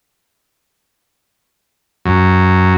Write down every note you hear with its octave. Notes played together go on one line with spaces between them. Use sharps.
F#2